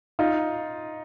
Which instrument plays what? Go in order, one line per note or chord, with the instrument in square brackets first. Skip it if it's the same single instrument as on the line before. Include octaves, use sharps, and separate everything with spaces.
[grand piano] D#4 F4